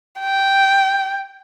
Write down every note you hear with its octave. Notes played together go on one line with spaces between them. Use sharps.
G5